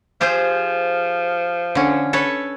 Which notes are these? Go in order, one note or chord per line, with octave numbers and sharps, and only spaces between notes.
F3 G4 G#4 C5
D3 C#4
A4 B4 C#5